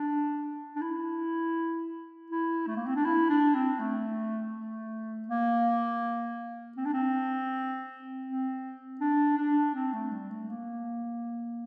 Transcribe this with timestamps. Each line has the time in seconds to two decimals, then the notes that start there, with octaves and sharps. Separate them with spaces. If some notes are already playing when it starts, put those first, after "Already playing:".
Already playing: D4
0.76 D4
0.81 E4
2.30 E4
2.67 A3
2.76 A#3
2.86 C4
2.95 D4
3.05 E4
3.29 D4
3.54 C4
3.79 A3
4.53 A3
5.28 A#3
6.77 C4
6.85 D4
6.93 C4
8.25 C4
9.00 D4
9.37 D4
9.74 C4
9.93 A3
10.12 G3
10.30 A3
10.49 A#3